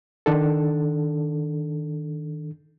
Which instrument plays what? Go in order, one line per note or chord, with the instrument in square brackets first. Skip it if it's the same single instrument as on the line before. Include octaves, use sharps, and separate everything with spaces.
[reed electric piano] D#3 D4 A4